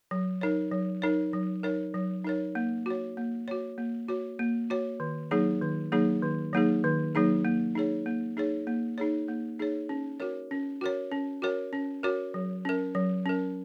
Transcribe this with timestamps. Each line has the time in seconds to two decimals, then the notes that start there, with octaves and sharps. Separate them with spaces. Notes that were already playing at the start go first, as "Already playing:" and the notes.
0.11 F#3
0.41 D#4 A#4 C#5
0.72 F#3
1.02 D#4 A#4 C#5
1.33 F#3
1.63 D#4 A#4 C#5
1.94 F#3
2.25 D#4 A#4 C#5
2.55 A#3
2.86 F#4 C#5
3.17 A#3
3.48 F#4 C#5
3.78 A#3
4.09 F#4 C#5
4.39 A#3
4.70 F#4 C#5
5.00 D#3
5.31 F#3 A#3 D#4 G#4
5.62 D#3
5.92 F#3 A#3 D#4 G#4
6.23 D#3
6.53 F#3 A#3 D#4 G#4
6.84 D#3
7.15 F#3 A#3 D#4 G#4
7.45 A#3
7.75 D#4 G#4 C#5
8.06 A#3
8.37 D#4 G#4 C#5
8.67 A#3
8.98 D#4 G#4 C#5
9.28 A#3
9.59 D#4 G#4 C#5
9.89 C#4
10.20 F#4 A#4 C#5
10.51 C#4
10.81 F#4 A#4 C#5
11.11 C#4
11.42 F#4 A#4 C#5
11.73 C#4
12.03 F#4 A#4 C#5
12.34 F#3
12.65 C#4 A#4
12.95 F#3
13.26 C#4 A#4